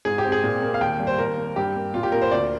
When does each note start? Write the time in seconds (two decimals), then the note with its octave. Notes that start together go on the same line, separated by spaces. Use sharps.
0.05 G#2 G#4
0.18 G4
0.24 C4
0.32 G#4
0.43 A#2
0.62 A#3
0.74 F5
0.81 D#2 G5
0.99 G3
1.07 C5
1.18 D#2 A#4
1.37 A#3
1.56 G2 G4
1.75 A#3
1.94 A#2 F4
2.03 G4
2.12 A#3 A#4
2.22 C5
2.31 D2 D5